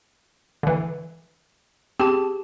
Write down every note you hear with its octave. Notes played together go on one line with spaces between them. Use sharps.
D3 E3
C4 G4 G#4 A5